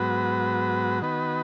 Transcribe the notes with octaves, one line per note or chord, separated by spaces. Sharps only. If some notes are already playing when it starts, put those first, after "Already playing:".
Already playing: G#2 F#3 B3 F#4 B4
D#3 B3 F#4 B4